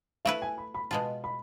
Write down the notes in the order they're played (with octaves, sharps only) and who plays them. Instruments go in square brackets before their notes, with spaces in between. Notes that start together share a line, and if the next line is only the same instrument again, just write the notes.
[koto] A3 E4 B4 [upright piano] F5
[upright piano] G#5
B5
B5
[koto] B2 G#3 B3 F4 [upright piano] A5
[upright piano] B5